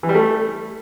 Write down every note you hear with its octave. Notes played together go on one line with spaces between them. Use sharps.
E3
G3
A3